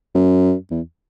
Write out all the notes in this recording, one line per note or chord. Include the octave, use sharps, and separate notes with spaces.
F#2
E2